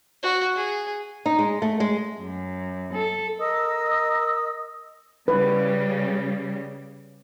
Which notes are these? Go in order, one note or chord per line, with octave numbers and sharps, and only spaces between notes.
F#4
G#4
D#4
G#3
A3
G#3
F#2
A4
A#4 D#5 D#6 E6
C#3 G3 B4